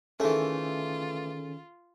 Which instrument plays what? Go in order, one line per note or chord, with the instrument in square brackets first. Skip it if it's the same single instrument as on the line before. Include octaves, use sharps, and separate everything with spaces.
[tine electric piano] D#3 C#4 [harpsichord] E3 A3 [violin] F4 [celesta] G#4 A4